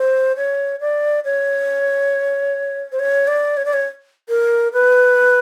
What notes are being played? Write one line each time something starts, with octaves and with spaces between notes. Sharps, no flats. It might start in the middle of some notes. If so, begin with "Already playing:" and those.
Already playing: C5
C#5
D5
C#5
C5
C#5
D5
C#5
D5
C#5
A#4
B4